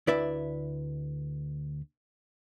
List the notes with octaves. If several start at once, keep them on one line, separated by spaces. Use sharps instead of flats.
D2 E4 B4 D5 E5